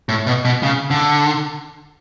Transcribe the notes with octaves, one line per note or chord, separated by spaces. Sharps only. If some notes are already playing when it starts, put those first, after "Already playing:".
A2
B2
B2
C#3
D3